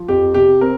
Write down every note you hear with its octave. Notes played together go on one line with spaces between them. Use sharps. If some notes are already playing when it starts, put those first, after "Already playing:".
Already playing: F3
F2 G4
C3 G4
C4 A#4